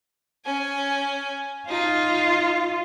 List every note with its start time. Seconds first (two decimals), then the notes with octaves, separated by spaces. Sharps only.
0.45 C#4 G#5
1.69 D#4 F4